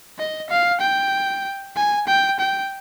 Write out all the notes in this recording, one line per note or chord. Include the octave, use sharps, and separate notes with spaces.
D#5
F5
G5
G#5
G5
G5